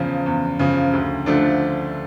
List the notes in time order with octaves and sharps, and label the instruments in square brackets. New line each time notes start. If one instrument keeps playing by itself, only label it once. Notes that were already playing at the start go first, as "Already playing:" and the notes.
Already playing: [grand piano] E2 C#3 F3
E2
C#3 F3
D2
D3 F3 A3 D4